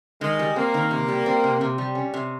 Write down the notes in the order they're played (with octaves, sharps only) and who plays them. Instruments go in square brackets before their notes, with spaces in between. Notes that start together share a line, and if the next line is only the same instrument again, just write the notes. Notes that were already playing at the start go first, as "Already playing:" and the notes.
[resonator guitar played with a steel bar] D#3 [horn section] G#3
[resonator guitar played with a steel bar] G3
[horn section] A#3 [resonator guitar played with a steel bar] C4
[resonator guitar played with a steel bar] D#3
C3
G3
C4
C3
C3
G3
C#4
C3